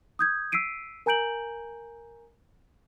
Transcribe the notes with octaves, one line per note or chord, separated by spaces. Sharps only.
D#6 G6 G#6
E6 B6 C7 D7 D#7
A#4 G#5 A#5 G6 D7 F#7